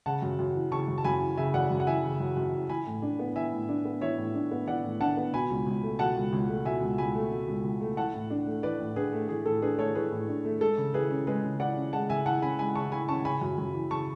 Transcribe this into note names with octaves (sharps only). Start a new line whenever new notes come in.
C#3 F#5 A5
F#2
F#2
E3
C#3 A5 C#6
F#2
A5
F#2 G#5 B5
E3
C#3 E5 G#5
F#2 D5 F#5
F#2
F#5
E3 E5 G#5
C#3
F#2
F#2
E3
E3 G#5 B5
A2
D4
B3
E3 E5 G#5
A2
D4
B3
E3 C#5 E5
A2
D4
B3
E3 D5 F#5
A2
D4 F#5 A5
B3
B2 G#5 B5
C#2
C#2
A3
B2 F#5 A5
C#2
C#2
A3
B2 E5 G#5
C#2
C#2 G#5 B5
A3
B2
C#2
C#2
A3
E3 F#5 A5
A2
D4
A3
E3 B4 D5
A2
D4 G#4 B4
A3
E3 G#4
A2 A4
D4 G#4 B4
A3 A4 C#5
E3 G#4 B4
A2
D4
A3
G#3 A4
C#3
E4 G#4 B4
C#4
G#3 G#4 B4
C#3
E4 D5 F#5
C#4
G#3 F#5 A5
C#3 E5 G#5
E4 F#5 A5
C#4 G#5 B5
G#3 G#5 B5
C#3 A5 C#6
E4 G#5 B5
C#4 A5 C#6
C#3 G#5 B5
F#2
F#2
E3
C#3 A5 C#6